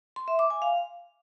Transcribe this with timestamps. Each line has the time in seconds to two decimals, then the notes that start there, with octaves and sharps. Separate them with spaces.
0.16 C6
0.28 E5
0.39 D6
0.50 G#5
0.62 F5